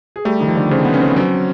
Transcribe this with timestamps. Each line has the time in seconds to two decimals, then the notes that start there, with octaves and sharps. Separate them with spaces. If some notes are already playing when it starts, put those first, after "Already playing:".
0.16 G#4
0.25 G3 A3 G4
0.40 D#3 D#4
0.48 F3
0.55 D3 D4
0.71 C#3 C4
0.84 B3
0.94 C#4
0.99 C4
1.16 F#3 C4